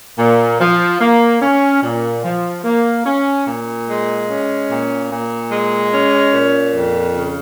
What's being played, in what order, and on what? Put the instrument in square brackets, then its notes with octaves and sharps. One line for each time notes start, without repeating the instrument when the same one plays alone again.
[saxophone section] A#2
F3
A#3
C#4
A#2
F3
A#3
C#4
A#2
G#3
C#4
A#2
A#2
G#3
C#4
A#2
F2
C#3